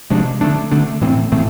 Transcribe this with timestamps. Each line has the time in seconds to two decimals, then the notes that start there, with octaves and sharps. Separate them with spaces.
0.10 C3 F3 G#3 D4
0.41 D3 A3 D4
0.71 D3 A3 D4
1.01 A2 E3 A3 C4
1.32 A2 E3 A3 C4